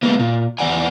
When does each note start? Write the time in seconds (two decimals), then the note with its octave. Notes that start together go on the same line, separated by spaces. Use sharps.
0.03 G#3 A#3 B3
0.19 A#2
0.59 E2 D5 F#5 G#5